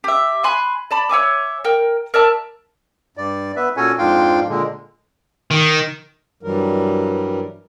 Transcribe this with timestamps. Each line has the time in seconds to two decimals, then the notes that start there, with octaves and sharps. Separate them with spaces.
0.04 G4 E5
0.44 G#5 B5 C6 F#6
0.91 D5 A5 B5
1.09 C#5 E5 G#5 D6
1.64 A#4 G5
2.14 A#4 D5 E5 A5
3.17 G2 D5
3.56 B3 B4 E5
3.77 A#2 C#4 F#4 A4 C#5 G#5
3.98 F2 G#2 D4 F4 F5 G5
4.49 A#2 D3 G#3
5.51 D#3
6.43 G2 E3 F#3 G3 A#4